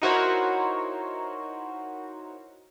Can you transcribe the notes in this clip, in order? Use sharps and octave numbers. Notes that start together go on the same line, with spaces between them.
D#4 E4 F#4 A#4 C5 C#5